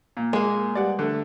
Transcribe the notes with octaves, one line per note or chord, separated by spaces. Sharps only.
A#2
G#3 A#3
G3 G4 B4 D5 F#5
D3 A3